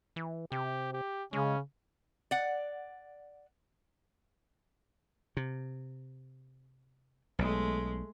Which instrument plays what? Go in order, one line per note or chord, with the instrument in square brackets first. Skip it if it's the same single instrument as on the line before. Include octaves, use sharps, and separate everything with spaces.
[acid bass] E3
[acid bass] C3 [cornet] G4
[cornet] G4
[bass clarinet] C#3 [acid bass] G#3 [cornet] C#4
[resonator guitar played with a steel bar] D5 F#5
[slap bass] C3
[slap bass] B1 [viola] G#3 A3